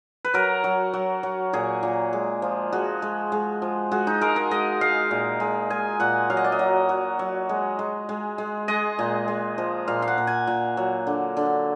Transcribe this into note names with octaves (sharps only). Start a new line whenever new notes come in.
B4
F#3 A#4
F#3
F#3
F#3
A#2 G#4
A#2
G#3
F3
G#3 F#4
G#3
G#3
F3
G#3 F#4
D#4
G#3 A#4
A#4
G#3 D#5
G#3 F5
A#2
G#3
G#3 G#5
A#2 F#5
F#3 F5
D#5
D5
D#5
F#3
F#3
F#3
G#3
G#3
G#3
G#3
G#3 D#5
A#2
G#3
F3
A#2 F5
F5
F#5
A#2
G#5
A#2
F#3
D3
D3